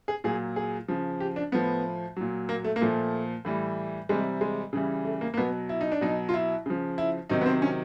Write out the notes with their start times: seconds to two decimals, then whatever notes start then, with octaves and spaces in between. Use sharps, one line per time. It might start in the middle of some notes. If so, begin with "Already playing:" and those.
0.08 G#4
0.24 A#2 F#3 G#4
0.56 G#4
0.88 C#3 F3
1.20 G4
1.36 D4
1.52 A2 F3 B3
2.16 A#2 F#3
2.49 A#3
2.64 A3
2.76 A#3
2.81 A#2 F3 A3
3.45 A2 E3 G3
4.09 C3 E3 G3 G#3
4.41 G#3
4.73 C#3 E3 G3
5.05 A3
5.21 A#3
5.34 A#3
5.37 B2 F#3 B3
5.69 E4
5.81 D#4
5.92 D4
6.01 B2 F#3 D#4
6.29 F4
6.34 E4
6.66 C#3 F3
6.98 E4
7.30 C3 D#3 F#3 D#4
7.41 B3
7.46 C4
7.62 C#4